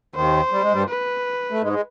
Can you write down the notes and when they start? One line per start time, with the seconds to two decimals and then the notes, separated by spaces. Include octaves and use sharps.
0.15 D#2 D#3 C5
0.52 G3
0.62 G#3
0.72 G2 G3
0.89 B4
1.51 A3
1.62 G#2 G#3
1.72 G#3